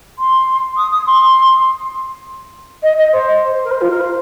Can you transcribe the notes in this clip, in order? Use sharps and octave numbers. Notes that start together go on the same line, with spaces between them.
C6
D#6
D#6
C6
D#5
D#5
C5
A#4
C5
F4
A#4
C5